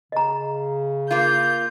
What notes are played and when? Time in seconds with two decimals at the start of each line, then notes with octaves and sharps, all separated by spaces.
0.12 C#3 D#5 A#5
1.11 A#3 F4 G6